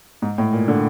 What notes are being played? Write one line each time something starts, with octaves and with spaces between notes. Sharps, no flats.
G#2
A2
A#2
D3